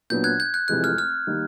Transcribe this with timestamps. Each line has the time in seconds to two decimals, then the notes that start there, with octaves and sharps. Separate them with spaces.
0.10 A#2 F#3 B3 D4 G6
0.24 F#6 G#6
0.40 G6
0.54 F#6
0.68 F1 F2 C3 E3 G#3 F#6
0.84 F6
0.98 F6
1.27 D#3 G3 A#3